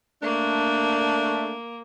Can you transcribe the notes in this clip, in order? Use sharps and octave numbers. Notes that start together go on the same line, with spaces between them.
A3 A#3 D4